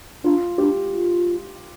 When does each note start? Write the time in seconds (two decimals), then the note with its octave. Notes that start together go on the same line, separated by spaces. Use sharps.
0.24 D4 F4
0.58 D4 G4
0.93 F4